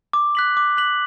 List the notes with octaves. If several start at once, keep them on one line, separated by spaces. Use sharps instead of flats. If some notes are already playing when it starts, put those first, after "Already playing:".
D6
F#6 B6 F#7
D6
F#6 B6 F#7